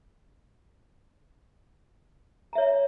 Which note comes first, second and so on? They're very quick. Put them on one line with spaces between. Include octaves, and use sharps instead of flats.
A#5 E5 C#5